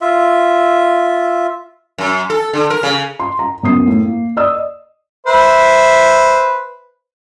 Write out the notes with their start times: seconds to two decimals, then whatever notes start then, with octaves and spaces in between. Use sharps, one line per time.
0.01 F4 E5
1.98 F#2
2.30 A4
2.53 D3
2.70 A#4
2.83 C#3
3.20 C6
3.39 A#5
3.63 F#2 B3 D#6 C7
3.88 A2
4.05 A#3
4.37 D5 D#5 D#6 E6
5.27 B4 C5 E5